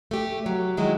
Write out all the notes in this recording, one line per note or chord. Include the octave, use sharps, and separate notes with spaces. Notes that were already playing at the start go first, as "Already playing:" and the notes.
A3 G4
F#3
D#3 F#3 G#3 E4